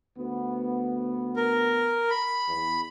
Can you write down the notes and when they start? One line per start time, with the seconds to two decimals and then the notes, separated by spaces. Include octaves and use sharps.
0.18 D2 B3
1.36 A#4
2.10 B5
2.48 E2